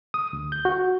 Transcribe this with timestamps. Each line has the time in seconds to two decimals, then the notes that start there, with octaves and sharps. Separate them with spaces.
0.14 D#6
0.33 D2
0.52 G6
0.65 F#4